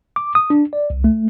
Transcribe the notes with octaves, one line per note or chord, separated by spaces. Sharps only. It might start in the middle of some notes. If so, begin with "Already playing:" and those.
D6
D#6
D4
D5
C2
A3